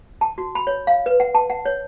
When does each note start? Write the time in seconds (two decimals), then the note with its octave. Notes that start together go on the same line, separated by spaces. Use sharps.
0.21 A5
0.38 F#4
0.55 B5
0.67 C#5
0.87 F5
1.06 B4
1.20 F#5
1.35 A5
1.50 F#5
1.65 C#5